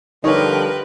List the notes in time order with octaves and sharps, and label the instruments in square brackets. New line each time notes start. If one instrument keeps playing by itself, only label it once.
[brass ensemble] D3 F3 G3 [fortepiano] D#4 C#5 [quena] A#4 [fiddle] B4 G5